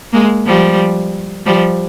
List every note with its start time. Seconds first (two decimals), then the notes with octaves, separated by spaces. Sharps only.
0.13 G#3 A#3
0.46 F3 G3
1.46 F3 G3